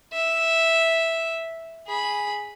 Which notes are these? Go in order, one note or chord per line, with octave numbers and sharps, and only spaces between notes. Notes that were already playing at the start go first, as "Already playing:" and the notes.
E5
G#4 B5